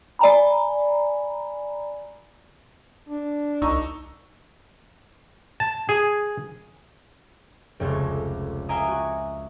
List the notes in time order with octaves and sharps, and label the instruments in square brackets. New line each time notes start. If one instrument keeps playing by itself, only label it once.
[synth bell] D5 G#5 A#5 B5
[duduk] D4
[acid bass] C2 [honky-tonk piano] D#4 C#6 E6
[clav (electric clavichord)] A5
G#4
[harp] F1 C#2 A3 C#5
E5 F5 G5 G#5 A#5 D#6
F#4 G#5